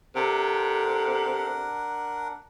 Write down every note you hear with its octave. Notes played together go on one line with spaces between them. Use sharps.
C3 D4 A4 A#4 F#5